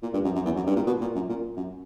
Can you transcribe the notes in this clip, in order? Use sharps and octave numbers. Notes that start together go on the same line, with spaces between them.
A#2
G2
F#2
F#2
E2
F#2
G2
A#2
B2
A#2
F#2
A#2
F#2